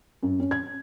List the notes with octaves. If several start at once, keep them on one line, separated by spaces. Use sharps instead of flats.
F#2
C#4
G#6